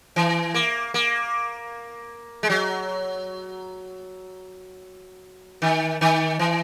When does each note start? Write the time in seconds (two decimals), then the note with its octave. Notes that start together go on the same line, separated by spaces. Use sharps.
0.16 E3
0.54 A#3
0.94 A#3
2.43 G#3
2.50 F#3
5.62 D#3
6.01 D#3
6.39 E3